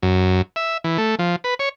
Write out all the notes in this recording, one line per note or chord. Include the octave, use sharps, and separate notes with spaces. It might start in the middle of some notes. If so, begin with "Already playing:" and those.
F#2
E5
E3
A3
F3
B4
C#5